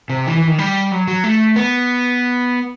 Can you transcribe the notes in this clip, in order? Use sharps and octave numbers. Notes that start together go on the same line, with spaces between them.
C3
E3
E3
D#3
G3
F#3
F#3
A3
B3